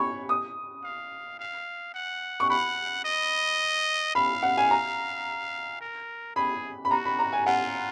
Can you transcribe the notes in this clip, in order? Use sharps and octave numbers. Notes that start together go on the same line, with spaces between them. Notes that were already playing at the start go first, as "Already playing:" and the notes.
Already playing: C#5 B5 C#6
D#6
F5
F5
F#5
C#6
F#5 B5
D#5
F5 B5
F#5
G#5
A#5
A#4
G#4 B5
B5
F#4 A#5
B5
A#5
G#5
F4 F#5